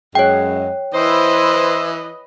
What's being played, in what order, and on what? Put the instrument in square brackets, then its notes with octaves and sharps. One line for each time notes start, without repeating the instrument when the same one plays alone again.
[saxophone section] F#2 G#3 [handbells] C#5 G5
[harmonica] E3 E4 [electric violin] B4 D#5 [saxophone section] C5